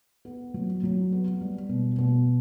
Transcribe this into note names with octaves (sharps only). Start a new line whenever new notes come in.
B3
F#3
F#3
B3
G3
B2
B2